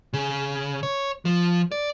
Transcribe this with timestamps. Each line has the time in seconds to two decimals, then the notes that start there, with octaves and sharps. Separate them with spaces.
0.13 C#3
0.83 C#5
1.25 F3
1.72 D5